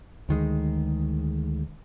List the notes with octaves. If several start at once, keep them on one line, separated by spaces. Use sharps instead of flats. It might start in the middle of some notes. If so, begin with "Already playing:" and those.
D2 D#3 G#3